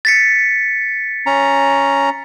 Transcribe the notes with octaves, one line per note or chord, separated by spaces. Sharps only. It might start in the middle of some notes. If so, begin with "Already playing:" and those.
A6 B6 C#7
C#4 A#5